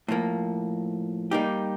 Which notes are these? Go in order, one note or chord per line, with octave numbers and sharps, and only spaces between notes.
A2 F3 A#3
G3 A#3 D#4 G4